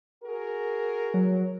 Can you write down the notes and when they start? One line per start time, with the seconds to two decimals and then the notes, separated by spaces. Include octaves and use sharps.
0.24 F#4 G#4 A#4
1.14 F#3